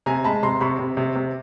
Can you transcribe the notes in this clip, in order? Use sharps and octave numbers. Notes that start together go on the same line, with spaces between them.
C3 G#5 A#5
G#3 A5 B5
C3 A#5 C6
C3 B5 C#6
C3
C3
C3